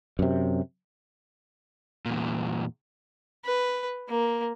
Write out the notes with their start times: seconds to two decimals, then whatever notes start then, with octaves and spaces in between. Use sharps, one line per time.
0.19 F#2 C3
2.06 E2 A#2
3.45 B4
4.09 A#3